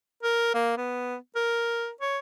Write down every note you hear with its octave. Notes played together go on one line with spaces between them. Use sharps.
A#4
A#3
B3
A#4
C#5